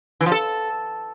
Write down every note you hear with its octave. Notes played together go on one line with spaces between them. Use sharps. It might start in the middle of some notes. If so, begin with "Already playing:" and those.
E3
F3
A4